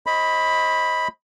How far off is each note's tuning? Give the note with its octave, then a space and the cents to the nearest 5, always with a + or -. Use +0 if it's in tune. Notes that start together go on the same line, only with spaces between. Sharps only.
C5 +35 D#5 +20 B5 +0